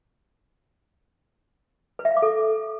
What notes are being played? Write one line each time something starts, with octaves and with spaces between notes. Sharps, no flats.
B4
E5
F5
D6
A4